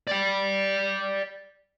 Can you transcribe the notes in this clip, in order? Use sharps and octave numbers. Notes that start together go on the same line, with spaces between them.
D5 G5